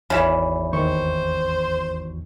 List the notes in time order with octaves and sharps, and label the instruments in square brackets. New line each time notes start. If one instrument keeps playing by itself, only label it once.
[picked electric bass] G#1 E2 [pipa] C#3 E3
[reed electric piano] D#2 D#3 C#6 [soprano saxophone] C5